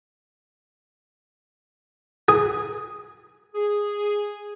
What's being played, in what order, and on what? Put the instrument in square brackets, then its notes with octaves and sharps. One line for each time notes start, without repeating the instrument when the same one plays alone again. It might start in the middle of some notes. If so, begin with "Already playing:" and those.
[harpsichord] G#4
[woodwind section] G#4